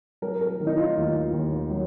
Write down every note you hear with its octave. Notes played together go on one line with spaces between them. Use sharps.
F#3 A#4
A#4
D#3
D#4
F4
D#2 F4
D#2
F#3